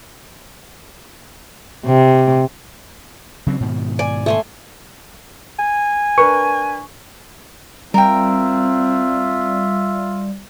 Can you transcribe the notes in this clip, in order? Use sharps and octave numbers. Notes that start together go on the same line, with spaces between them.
C3
C#3 F#3 C4
G#2 B2 D#3
D5 G#5
A3 G#5 C6
G#5
D4 A#4 B4 C#6
G3 C4 F4 A#4 E5 G5